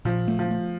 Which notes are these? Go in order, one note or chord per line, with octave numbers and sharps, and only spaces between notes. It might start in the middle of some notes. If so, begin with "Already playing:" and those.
A#2 F3
A3
F3
A3